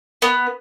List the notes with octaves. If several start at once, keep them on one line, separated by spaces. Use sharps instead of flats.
B3